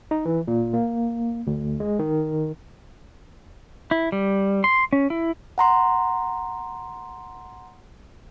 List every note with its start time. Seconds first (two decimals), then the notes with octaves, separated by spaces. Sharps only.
0.11 D#4
0.25 E3
0.48 A#2
0.73 A#3
1.47 D2
1.80 G#3
1.99 D#3
3.91 E4
4.12 G3
4.64 C6
4.93 C#4
5.10 E4
5.58 F#5 A#5 C6